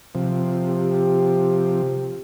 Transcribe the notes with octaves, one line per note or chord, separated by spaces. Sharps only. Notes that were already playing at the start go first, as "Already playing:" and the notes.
C3 F3
G4